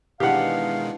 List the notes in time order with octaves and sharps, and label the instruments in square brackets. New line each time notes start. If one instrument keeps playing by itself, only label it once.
[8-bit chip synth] B2 D#3 G#3 [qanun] E3 D4 [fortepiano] G4 F#5 [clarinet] F5